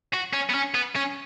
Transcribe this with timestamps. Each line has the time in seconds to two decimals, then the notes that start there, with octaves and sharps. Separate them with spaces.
0.13 F#4
0.33 C#4
0.49 B3
0.54 C#4
0.74 B3
0.96 C#4